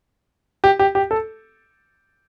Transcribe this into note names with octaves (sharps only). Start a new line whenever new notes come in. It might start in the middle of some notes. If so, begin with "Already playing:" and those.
G4
G4
G4
A4